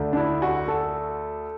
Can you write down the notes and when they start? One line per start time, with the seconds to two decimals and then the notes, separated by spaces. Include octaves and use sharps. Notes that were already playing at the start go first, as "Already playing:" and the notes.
Already playing: D2 D3
0.13 D4
0.17 E4
0.42 F#4
0.68 A4